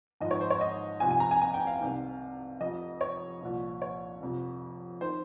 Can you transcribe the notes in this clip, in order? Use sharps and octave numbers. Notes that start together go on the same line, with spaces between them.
G#1 G#2 F3 D#5
C#5
C5
C#5
D#5
C2 C3 F3 G#5
G#5
A#5
G#5
G#5
G5
F5
C2 C3 D#3
F1 F2 C3 D#5
C#5
C2 A#2 F3
C#5
F1 F2 C3
D#3 C5